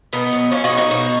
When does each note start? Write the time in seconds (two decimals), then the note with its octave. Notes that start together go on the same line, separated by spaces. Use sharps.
0.13 B2 B3 D#4
0.33 F#3
0.51 F#3 C#4 F4
0.64 D#4 F#4
0.71 B2
0.77 D#4 F#4
0.91 B2